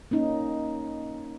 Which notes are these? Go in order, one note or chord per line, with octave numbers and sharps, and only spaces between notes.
A#3 C#4 D#4